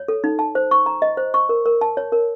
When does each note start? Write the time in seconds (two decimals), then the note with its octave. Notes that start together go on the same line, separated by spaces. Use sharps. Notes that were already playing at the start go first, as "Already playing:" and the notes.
Already playing: C#5
0.08 A4
0.24 D#4
0.39 A5
0.55 C5
0.71 C#6
0.86 A#5
1.02 D#5
1.17 C5
1.34 C#6
1.49 A#4
1.66 A#4
1.81 A5
1.97 C#5
2.12 A#4